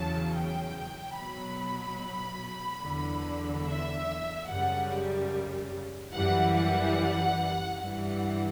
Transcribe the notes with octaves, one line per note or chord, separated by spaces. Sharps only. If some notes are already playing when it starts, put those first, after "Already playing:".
Already playing: E2 C#3 F#3 A5
G5
B2 F#3 B5
E2 D3 F#3
E5
F#2 C#3 G3 F#5
F#2 E3 G3 F#5
F#5
G2 E3 G3 F#5